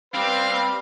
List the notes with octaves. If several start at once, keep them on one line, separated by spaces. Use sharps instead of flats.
G3 C4 B4 F5